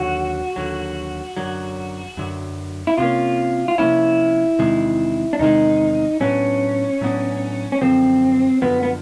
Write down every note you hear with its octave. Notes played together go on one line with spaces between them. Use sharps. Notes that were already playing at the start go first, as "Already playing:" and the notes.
Already playing: D#2 D3 F#3 F#4
D#2 D3 F#3
F#2 D3 F#3
F#2 D3 F#3
E4
C3 F3 A#3 C#4 F4
F4
C3 F3 A#3 C#4 E4
E2 C3 D#3 G#3
D4
E2 C3 D#3 G#3 D#4
A2 F#3 B3 C#4 D4
A2 F#3 B3 D4
C#4
F#2 D3 F3 C4
F#2 D3 F3 B3
B3